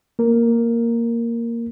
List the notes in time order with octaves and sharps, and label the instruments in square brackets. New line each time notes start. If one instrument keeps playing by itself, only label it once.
[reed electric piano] A#3 A#4